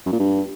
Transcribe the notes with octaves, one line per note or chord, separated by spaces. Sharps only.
F#2
A#2
G2